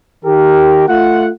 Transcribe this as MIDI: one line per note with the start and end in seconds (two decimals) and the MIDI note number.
0.25 0.86 51
0.25 0.86 67
0.25 0.86 70
0.88 1.29 57
0.88 1.29 65
0.88 1.29 78